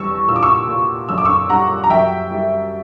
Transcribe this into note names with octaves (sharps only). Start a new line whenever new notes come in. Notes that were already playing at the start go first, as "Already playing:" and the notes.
Already playing: E2 G3 C#6 E6
A#2 E6
D6
C#6 E6
A#2
F#2 E6
D6
C#6 E6
G3 F#5 A#5
A#5
F#2 E5 G5
G3